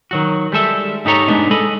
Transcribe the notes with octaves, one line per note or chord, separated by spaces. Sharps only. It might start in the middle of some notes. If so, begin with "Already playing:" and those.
D#3 F#3 F#4
G3 G#3 A4 E5
G#2 D#4 G4 A4 C#5 A#5
G#3 A3 B3 D4 D#4
G#3 A4 D#5 B5